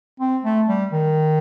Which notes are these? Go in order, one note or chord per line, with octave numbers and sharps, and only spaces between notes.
C4
A3
G3
D#3